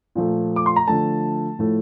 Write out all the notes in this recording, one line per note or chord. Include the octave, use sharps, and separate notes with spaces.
A#2 F3 A3
D6
C6
A#5
D3 F3 A3 A5
A2 F3 A3